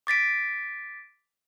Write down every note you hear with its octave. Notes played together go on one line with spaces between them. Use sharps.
D6 A6 B6 D7